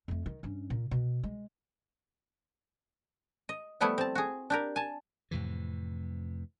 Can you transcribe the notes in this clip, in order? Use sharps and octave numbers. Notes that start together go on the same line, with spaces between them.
F2 A3
D#3
G2 C#4
A#2
B2
G#3
D#5
F3 G3 A3 B3 E4
C4 A5
F#4 G#4
D4 G4 A#4
G#5 A5
F2 A2 C3 E3